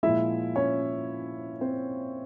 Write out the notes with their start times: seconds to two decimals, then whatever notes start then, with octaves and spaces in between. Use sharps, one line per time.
0.03 A#2 F3 G#3 E4 E5
0.56 C#4 C#5
1.61 C4 C5